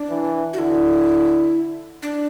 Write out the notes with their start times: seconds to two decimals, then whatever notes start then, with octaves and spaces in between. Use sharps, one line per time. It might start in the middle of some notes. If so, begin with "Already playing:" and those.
Already playing: D4
0.10 E3
0.53 F#4
0.58 D3 E4
2.02 D4